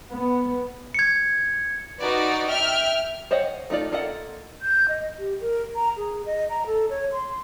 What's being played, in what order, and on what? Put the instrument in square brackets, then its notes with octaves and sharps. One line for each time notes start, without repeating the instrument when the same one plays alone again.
[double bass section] B3
[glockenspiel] G#6 C#7
[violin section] D#4 F#4 B4 D5
E5 G5 F6
[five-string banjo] C5 C#5 D#5 F5 F#5
A3 D#4 F4 D5
A#3 F4 A4 D#5 F#5
[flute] G6
D#5
G4
A#4
A#5
G#4
D#5
A#5
A4
C#5
C6